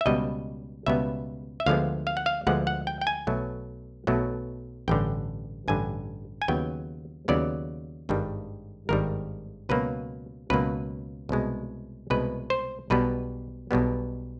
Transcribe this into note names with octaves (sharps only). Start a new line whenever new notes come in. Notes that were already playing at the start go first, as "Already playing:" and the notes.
E5
C#2 B2 G3 B3 D#5
C#2 B2 G3 B3 E5
E5
D2 D3 F3 G#3 B3 F5
F5
F#5
F5
D2 D3 F3 G#3 B3 F#5
F#5
G5
G5
G#5
B1 B2 F#3 A3
B1 B2 F#3 A3
A1 G2 D3 G5
A1 G2 D3 G#5
G#5
D#2 C#3 F#3 B3 G5
D#2 C#3 F#3 B3 D5
G#1 G2 D#3 G3
G#1 G2 D#3 G3 A#4
C#2 B2 F#3 A#3 B4
C#2 B2 F#3 A#3 B4
C2 B2 G#3
C2 B2 G#3 B4
C5
B1 B2 G3 B3 B4
B1 B2 G3 B3